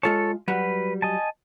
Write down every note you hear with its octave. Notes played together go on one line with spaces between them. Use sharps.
G#3 F4 A4 C#5 A5
F#3 G3 F#4 B4
D#5 G#5 A5